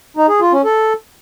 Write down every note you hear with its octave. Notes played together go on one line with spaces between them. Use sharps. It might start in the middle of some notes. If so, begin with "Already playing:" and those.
D#4
G#4
F4
C#4
A4